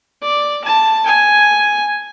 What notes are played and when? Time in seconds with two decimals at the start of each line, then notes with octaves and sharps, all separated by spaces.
0.22 D5
0.64 A5
1.05 G#5